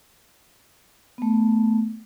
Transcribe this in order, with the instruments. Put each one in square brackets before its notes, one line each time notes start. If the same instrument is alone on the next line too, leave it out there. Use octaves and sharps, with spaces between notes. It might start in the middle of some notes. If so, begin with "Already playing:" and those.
[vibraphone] A3 B3